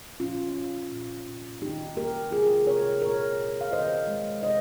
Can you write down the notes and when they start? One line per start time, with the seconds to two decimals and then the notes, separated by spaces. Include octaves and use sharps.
0.20 A#2 C#4 F4
0.56 A#2
0.91 A#2
1.26 A#2
1.62 D#3 D#4 G4
1.96 A#3 G4 A#4
2.31 C3 F4 G#4
2.67 C3 A#4 C#5
3.02 A#2 A#4 C#5
3.38 A#2
3.61 F5
3.72 D#3 C5 D#5
4.07 G#3
4.43 C3 C5 D#5